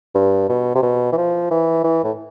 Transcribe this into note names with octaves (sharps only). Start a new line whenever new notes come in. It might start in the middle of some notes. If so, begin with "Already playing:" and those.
G2
B2
C3
B2
E3
F3
E3
E3
A2